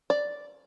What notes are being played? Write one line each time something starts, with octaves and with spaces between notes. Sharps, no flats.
D5